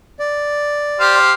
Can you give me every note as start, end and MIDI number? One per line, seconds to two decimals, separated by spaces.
0.19 1.18 74
1.00 1.32 67
1.00 1.32 72
1.00 1.32 77